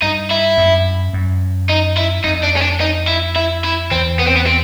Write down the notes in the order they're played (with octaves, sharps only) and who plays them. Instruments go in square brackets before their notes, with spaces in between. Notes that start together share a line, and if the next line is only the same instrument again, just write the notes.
[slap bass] G2 [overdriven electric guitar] D#4
[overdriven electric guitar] E4
[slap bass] F#2
F#2
[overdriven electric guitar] D#4
E4
[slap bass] F2 [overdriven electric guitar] D#4
[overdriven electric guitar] D4
C#4
D4
D#4
E4
E4
E4
[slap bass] E2 [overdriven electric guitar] C4
[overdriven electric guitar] B3
C4
B3
C4